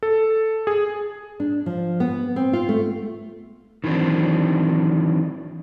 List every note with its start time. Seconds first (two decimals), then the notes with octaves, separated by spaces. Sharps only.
0.03 A4
0.67 G#4
1.40 D4
1.66 F3
2.00 B3
2.36 C4
2.53 F4
2.69 A3
3.84 D#3 E3 F#3 C4 D4